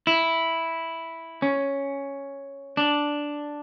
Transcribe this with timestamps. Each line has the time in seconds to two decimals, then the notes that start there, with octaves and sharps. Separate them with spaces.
0.07 E4
1.42 C#4
2.77 D4